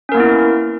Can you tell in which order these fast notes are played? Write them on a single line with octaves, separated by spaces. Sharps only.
C#4 A#4 A#3 B3 E4